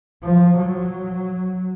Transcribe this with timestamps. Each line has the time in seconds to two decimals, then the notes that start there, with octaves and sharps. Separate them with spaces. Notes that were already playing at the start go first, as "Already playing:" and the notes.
0.24 F3
0.60 F#3